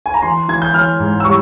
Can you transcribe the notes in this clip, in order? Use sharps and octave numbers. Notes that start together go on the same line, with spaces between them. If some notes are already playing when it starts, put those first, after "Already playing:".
G#5
A#5
E3 C6
E3 G#6
G6
E3 F6
G#2
E6
G3 C#6